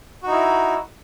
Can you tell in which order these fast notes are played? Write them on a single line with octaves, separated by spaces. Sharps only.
F#4 D#4 E4